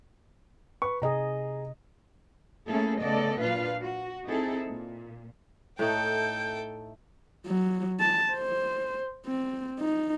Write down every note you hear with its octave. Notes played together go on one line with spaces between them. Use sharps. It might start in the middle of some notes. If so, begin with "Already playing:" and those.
B4 C#6
C3 G#4 D#5 A#5
A3 A#3 C#4 E4 G#4 A4
C#3 A3 B3 A4 D5 D#5
A#2 F#3 D4 F4 B4 F5
F#4
C4 D#4 E4 G#4 A4
A#2
A2 A3 D#4 A4 G5 G6
F#3
A5
C5
C4
D#4